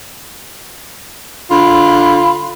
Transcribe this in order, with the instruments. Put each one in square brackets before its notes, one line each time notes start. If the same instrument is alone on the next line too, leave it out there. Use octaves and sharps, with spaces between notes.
[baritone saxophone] D3 [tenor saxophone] F4 [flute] B5